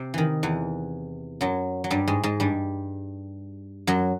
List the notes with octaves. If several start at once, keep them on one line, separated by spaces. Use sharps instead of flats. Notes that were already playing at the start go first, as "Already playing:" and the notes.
Already playing: C3
D#3 E3
E2 E3
F#2 F#3
F#3
G2 G3
G#2 G#3
G#2 G#3
G2 G3
F#2 F#3